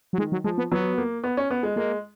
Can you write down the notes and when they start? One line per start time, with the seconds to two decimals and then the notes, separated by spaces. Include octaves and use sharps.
0.13 F#3
0.18 D#3 G#3
0.32 F#3
0.44 F3 G#3
0.58 B3
0.72 F#3 B3
0.98 A#3
1.24 B3
1.37 C#4
1.50 B3
1.63 G#3
1.76 G#3 A#3